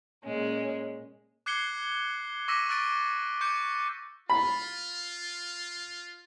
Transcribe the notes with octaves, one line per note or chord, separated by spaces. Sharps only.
A#2 G#3 C#4
D6 F#6 G#6 C7 C#7 G7
C#6 D6 E6 A#6 B6 D#7
C#6 E6 F#6 A6 D7
C#6 D6 G6 C#7
F4 B5